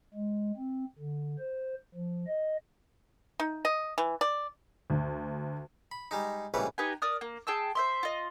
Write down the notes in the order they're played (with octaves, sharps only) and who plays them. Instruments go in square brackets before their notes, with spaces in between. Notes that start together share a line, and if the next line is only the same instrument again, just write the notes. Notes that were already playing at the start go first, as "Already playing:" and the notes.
[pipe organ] G#3
C4
D3
C5
F3
D#5
[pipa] D#4
D#5
E3
D5
[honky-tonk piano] D2
[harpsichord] B5
G3 G#3 D#4
A#1 G#2 C#3 E3 G3 B4
[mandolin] D#4 G4 B4 G#5
A#4 D5 D#6 F6
A#3
G#4 G5 A5 E6
C5 E5 C6
F4 D#5